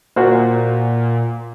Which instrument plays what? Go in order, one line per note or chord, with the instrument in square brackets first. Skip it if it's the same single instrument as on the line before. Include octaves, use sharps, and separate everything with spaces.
[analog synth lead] A#2 [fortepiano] F#4 A#4 C5